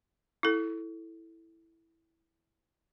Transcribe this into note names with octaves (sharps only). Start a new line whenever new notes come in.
E4 A4